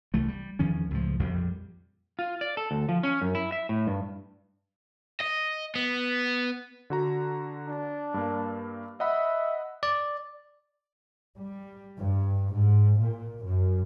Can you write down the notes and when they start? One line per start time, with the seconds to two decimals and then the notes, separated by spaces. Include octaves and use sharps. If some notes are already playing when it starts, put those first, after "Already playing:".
0.14 C2 E3 A3
0.28 G3
0.59 E2 D#3 F3 C#4
0.91 C#2 A2 F3
1.19 A#1 F2 G3
2.19 F4
2.41 D5
2.57 A4
2.71 D2
2.89 F3
3.03 C#4
3.22 F#2
3.35 E4
3.52 E5
3.69 A2
3.87 G2
5.20 D#5
5.76 B3
6.90 D3 F#4 A#5
7.68 D4
8.14 G2 A#3
9.00 D#5 E5 F#5 B5
9.83 D5
11.37 G3
11.99 G2
12.56 G#2
13.01 A#2
13.44 F#2